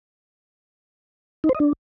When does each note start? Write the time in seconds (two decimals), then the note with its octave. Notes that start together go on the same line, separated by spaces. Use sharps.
1.44 D#4
1.49 C5
1.55 D#5
1.60 D4